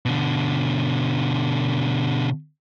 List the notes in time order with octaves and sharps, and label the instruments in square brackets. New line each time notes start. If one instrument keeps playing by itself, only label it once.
[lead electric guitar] B2 D3